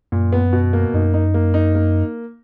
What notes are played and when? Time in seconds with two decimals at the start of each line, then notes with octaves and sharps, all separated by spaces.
0.12 F#2 A#2
0.33 B3
0.53 B2
0.73 A#3
0.94 F#2 D#4
1.14 D#4
1.34 A#3
1.54 D#4
1.75 A#3